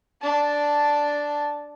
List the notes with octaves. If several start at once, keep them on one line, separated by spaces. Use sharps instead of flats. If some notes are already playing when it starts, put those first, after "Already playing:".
D4 A5